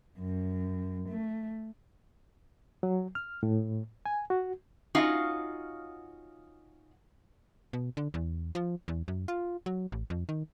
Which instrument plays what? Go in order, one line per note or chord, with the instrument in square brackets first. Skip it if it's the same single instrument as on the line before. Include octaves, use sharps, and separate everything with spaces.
[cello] F#2
A3
[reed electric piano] F#3
F6
A2
G#5
F#4
[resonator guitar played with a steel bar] C#4 D#4 F4 F#4 F5
[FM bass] B2
D3
E2
F3
E2
F#2
F4
F#3
A1
F2
D#3